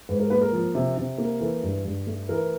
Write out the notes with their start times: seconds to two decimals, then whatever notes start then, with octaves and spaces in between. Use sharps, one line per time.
0.09 G#2 B4
0.20 A#4
0.30 A#3 B4
0.41 A#4
0.52 F3
0.75 C3
0.97 C3
1.18 A#3
1.40 E3 A4
1.63 G2
1.85 G2
2.07 A3
2.29 E3 A#4